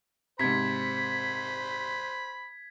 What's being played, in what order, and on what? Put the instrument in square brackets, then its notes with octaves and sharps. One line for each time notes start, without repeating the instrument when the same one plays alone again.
[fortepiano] G#2 C3 [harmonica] C5 B5 [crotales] G#6 B6